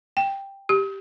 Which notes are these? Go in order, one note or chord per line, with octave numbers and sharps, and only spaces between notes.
G5
G4